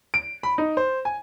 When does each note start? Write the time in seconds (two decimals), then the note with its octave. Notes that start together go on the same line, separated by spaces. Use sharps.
0.14 D7
0.43 B5
0.58 D#4
0.77 C5
1.05 G#5